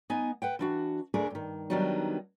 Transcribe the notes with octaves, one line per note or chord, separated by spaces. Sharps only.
B3 D#4 D#5 G#5
B4 F#5 G5
E3 D4 F#4
D2 A3 D4 G#4 A#4
G2 D#3
D#3 F#3 G3 B3 D4 D#4